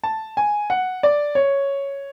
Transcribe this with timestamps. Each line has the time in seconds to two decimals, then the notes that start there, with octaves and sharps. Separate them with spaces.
0.04 A5
0.37 G#5
0.70 F#5
1.03 D5
1.35 C#5